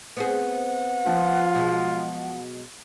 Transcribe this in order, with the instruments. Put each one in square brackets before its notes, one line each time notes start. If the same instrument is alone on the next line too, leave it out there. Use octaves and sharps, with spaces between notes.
[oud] B3 C4 G#4 [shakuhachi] F#5
[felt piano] F3 [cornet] F4
[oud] B2 F#3 G#3